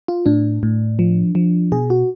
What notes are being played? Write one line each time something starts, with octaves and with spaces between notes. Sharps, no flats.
F4
A2 D4
A2
F3
F3
B2 G#4
F#4